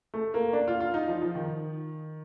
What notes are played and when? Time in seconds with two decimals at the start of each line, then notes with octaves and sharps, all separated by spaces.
0.14 A3
0.34 A#3
0.53 D4
0.68 F4
0.81 F4
0.94 D#4
1.08 F3
1.22 F3
1.35 D#3